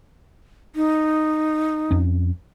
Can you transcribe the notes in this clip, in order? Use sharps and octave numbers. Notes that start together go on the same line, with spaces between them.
D#4
F2 C#4